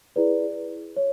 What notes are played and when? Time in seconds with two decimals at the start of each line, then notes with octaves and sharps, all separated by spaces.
0.16 E4 G#4 B4 D5
0.96 C#5